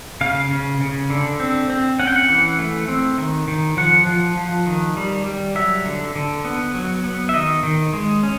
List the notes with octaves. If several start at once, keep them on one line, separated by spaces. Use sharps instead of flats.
C#3 F5
C#3
C#3
D3
C4
C4
C#4 F#5
G5
F#5
E3
A3
C4
D#3
D#3
F3 F#5
F3
F3
D#3
G3
G3
F#3 E5
D3
D3
B3
F#3
B3
E5
D#3 D#5
D#3
G#3
C#4